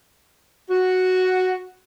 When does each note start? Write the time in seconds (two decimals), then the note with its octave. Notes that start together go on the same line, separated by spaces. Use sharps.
0.70 F#4